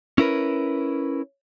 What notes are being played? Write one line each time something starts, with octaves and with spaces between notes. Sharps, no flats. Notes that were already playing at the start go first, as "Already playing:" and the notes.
C#4 E4 A#4 B4